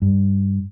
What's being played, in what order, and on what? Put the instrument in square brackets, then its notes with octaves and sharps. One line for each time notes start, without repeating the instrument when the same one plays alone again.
[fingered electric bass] G2